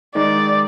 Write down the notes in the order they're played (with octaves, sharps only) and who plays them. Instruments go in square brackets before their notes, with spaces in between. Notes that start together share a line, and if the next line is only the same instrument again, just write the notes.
[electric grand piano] D#3 G#3 D#4 [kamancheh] D5